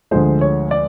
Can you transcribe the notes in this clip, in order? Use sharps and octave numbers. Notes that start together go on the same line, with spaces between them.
D2 D3 F3 G#3 C5
C#5
D5